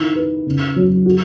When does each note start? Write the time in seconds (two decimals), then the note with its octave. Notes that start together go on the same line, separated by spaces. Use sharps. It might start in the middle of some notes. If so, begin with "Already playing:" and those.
Already playing: D#3 E4
0.16 B4
0.46 C#3
0.76 F#3
1.06 F#4